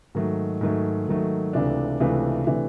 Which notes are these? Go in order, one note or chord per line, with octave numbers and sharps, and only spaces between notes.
G#2 D#3 F#3 A3
G#2 D#3 F#3 A3
G#2 D#3 F#3 A3
C#2 C3 E3 A3 D4
C#2 C3 E3 A3 D4
C3 E3 A3 D4